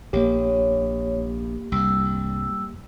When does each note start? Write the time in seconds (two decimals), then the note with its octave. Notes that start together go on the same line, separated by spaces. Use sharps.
0.13 A#1 A#3 G4 C#5
1.72 C2 G2 G3 E6